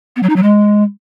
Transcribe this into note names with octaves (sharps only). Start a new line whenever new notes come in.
B3
F#3
D#4
F#3
G#3